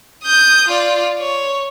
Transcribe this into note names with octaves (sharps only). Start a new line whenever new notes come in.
D#6 G6
F4 D5
C#5